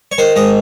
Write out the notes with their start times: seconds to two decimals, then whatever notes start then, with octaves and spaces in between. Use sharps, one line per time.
0.12 C#5
0.18 D#3 C5
0.36 G#2 D#5